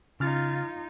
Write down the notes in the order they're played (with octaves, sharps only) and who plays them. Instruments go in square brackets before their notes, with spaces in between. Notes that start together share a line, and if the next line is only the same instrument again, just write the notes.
[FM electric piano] C#3 F6 A6 [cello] D#4 F4